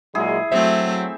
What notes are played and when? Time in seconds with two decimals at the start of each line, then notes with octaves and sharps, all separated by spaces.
0.15 A#2 F#3 G#3 E4 G#4
0.52 F#3 A3 C4 C5 E5